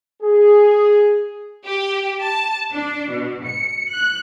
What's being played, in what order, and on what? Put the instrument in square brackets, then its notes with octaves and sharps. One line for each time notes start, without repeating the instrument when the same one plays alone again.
[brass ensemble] G#4
[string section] G4
A5
D4
B2
C#7
F#6